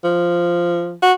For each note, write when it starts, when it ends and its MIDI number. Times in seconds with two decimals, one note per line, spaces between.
0.04 0.94 53
1.02 1.13 66